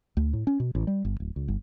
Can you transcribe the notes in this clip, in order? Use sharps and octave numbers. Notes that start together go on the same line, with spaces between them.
D2
A2
C#4
B2
A1
G3
G1
D1
C#2
G1